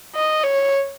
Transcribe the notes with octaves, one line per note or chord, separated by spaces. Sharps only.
D#5
C#5